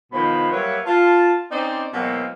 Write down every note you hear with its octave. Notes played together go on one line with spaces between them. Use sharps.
B2 D#3 F3 G#3 C5 B5
F#3 G3 A#3 B4 C#5 E5
F4 A5
C4 C#4 D#4 C5 D5
B2 E3 F#3 G#3 A#3 C4